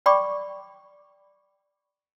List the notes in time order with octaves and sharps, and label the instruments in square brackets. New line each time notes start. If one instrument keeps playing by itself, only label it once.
[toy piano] D5 G5 B5 C#6 D6